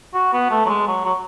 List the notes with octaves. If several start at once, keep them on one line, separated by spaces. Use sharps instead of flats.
F#4
B3
A3
F#3
G#3
F#3
F#3